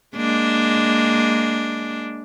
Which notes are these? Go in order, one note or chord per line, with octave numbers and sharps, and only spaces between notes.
G#3 A#3 D4